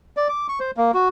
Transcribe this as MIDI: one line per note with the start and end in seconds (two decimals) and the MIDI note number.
0.17 0.28 74
0.29 0.47 86
0.49 0.59 85
0.60 0.71 72
0.77 0.91 58
0.94 1.08 66